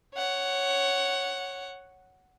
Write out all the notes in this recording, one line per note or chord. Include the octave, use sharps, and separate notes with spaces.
C#5 F#5